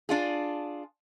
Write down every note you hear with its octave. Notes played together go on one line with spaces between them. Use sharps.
D4 F4 G#4